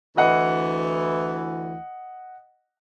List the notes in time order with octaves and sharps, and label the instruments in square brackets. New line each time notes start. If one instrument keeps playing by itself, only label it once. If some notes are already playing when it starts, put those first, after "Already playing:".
[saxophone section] D2 E3 [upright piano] D#5 F#5